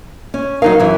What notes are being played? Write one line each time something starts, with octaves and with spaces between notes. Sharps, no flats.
C#4
F#3 D#4 A#4 F5
F#2 E3